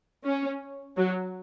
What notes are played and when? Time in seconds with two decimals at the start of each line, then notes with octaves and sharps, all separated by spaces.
0.24 C#4
0.97 F#3